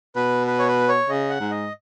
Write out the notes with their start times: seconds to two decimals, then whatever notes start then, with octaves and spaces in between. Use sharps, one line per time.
0.16 B2 B4
0.47 B4
0.59 C#5
0.68 B4
0.89 C#5
1.09 C#3 D#5
1.29 F#5
1.40 G#2
1.51 D#5